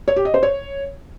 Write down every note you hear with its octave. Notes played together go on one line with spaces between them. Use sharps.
C#5
G4
D#5
C5
C#5